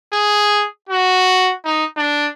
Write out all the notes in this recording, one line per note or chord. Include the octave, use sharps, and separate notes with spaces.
G#4
F#4
D#4
D4